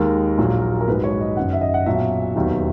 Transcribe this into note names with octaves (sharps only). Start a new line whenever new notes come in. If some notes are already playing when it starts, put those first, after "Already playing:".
Already playing: D#2 D#3 G#3 A#4
A#1 A#2 F#3
A#4
A#1 G#2 F#3 B4
C#5
D#5
F#1 F#2 D#3 F#5
E5
D#5
F#5
B1 A#2 F#3 E5
E1 D#2 D#3 F#3